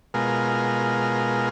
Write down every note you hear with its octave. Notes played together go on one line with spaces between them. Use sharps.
B2 G#3 F4 A#4